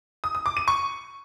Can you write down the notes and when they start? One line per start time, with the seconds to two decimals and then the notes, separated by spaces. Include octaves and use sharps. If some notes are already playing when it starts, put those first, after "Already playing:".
0.24 D#6
0.35 D#6
0.46 D6
0.57 D#7
0.68 C#6